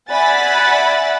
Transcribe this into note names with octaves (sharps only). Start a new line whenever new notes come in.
D5 E5 F#5 G#5 B5 A6